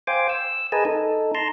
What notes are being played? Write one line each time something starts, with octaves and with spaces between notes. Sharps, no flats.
C5 F5 G5 G#5 D6
E6
G#4 A#4 B4 D#5 G#5 A5
D#4 A4
A5 A#5 C6